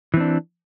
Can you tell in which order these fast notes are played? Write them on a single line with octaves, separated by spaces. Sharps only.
E3 C4 D4